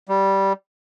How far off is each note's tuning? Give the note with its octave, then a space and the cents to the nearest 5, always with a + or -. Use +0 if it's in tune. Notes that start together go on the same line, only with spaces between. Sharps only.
G3 -10